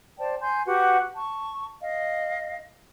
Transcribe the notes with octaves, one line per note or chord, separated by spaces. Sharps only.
C5 D5 G5 A5
G#5 C6 G6
F#4 G4 B4 F#5
A5 C#6
D#5 F5